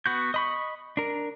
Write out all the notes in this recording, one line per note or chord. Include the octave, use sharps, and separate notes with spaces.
B3 F#4 G6
D#5 B5 C#6
D4 A#4